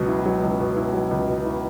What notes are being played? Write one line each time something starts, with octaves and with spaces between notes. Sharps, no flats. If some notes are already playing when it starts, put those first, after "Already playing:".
Already playing: C#2 B2 F#3
E4
F#3
C#2
B2
E4
F#3
C#2
B2
E4